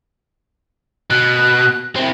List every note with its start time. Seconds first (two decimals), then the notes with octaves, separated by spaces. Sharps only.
1.10 B2 F#6
1.96 C4 E4